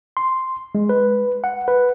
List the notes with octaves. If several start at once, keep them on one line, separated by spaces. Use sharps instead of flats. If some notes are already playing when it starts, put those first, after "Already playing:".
C6
G#3
B4
F#5
B4